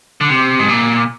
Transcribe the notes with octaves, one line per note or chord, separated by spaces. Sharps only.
D3
C3
G#2
A#2